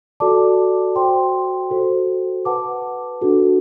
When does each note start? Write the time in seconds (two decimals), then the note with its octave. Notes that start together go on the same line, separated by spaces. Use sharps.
0.20 F#4 A4 D5 A5 D6
0.95 F#4 C5 G5 C6
1.71 F#4 A4 C5
2.45 B4 F#5 A5 D6
3.21 D4 F#4 A4